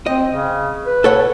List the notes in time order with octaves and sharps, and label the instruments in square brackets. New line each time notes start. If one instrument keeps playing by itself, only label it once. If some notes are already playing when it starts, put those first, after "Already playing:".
[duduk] C4 [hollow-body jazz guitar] D#5
[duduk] C#3
B4
[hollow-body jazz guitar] A4 C#5 F#5